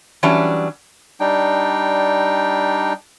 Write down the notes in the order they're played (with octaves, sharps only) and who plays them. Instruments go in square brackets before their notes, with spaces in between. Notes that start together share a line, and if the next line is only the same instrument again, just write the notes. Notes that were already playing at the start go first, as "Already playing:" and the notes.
[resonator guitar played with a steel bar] E3 F#3 G3 C#4 D4
[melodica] G3 D4 D#4 G5